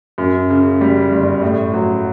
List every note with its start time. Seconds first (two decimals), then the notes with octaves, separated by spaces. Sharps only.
0.18 F#2
0.50 C#3
0.81 G3
1.12 G1
1.42 A2
1.74 F#3